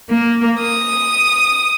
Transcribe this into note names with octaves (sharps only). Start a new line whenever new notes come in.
A#3
D#6